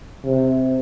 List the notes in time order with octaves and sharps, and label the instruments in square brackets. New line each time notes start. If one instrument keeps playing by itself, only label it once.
[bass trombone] C3